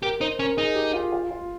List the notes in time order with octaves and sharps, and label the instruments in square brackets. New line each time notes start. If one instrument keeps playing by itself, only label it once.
[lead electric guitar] G4 [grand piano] A#4
[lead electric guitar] D#4 [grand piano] C5
[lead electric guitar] C#4 [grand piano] A#4
[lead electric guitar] D#4 [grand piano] G#4
[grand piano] G4
F4
F4
F4